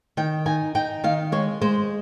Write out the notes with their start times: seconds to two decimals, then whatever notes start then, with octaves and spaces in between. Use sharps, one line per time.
0.17 D#3 G5
0.46 D#4 G#5
0.75 D#4 G5
1.04 D#3 F5
1.32 G#3 C#5
1.61 G#3 C5